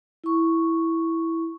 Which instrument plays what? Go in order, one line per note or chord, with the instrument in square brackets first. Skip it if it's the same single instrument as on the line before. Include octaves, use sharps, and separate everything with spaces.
[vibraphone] E4 C#6